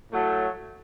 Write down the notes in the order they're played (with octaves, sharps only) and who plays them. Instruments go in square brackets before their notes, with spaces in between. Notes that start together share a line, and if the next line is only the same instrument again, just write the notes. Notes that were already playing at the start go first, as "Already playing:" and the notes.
[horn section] A2 F#3 A3